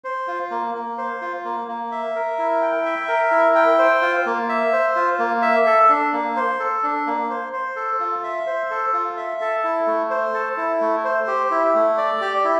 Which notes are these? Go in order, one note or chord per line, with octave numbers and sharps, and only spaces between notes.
C5
F4
A#3
A#3
C5
F4
A#3
A#3
E5
A#4
E4
G5
E5
A#4
E4
G5
C5
F4
A#3
E5
C5
F4
A#3
E5
A4
D4
A#3
C5
A4
D4
A#3
C5
C5
A4
F4
E5
C5
A4
F4
E5
A4
E4
A3
C5
A4
E4
A3
C5
G4
E4
A3
D5
G4
E4